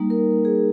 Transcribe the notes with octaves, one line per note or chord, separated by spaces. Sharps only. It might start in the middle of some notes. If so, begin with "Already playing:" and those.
Already playing: G3 A#3 D#4
A#4
G#4